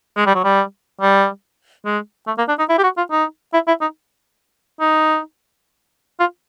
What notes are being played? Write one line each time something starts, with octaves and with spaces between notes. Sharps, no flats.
G#3
G3
F#3
G3
G3
G#3
A3
A#3
D4
D#4
E4
G4
F#4
F4
D#4
E4
E4
D#4
D#4
F4